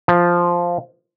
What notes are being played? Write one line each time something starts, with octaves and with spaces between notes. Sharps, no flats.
F3